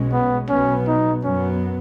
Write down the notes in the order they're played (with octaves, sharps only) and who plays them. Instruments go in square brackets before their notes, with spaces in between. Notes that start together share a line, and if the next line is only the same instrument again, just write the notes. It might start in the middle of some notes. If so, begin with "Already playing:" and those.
Already playing: [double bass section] B1 B2 G#3 C#4
[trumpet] B3
[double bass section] B1 B2 F#3 B3 [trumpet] C#4
[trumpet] D#4
[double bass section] F#2 F#3 B3 [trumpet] C#4